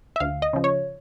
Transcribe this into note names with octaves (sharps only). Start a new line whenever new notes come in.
E5
D2 F5
D#5
C#3 F3
C#5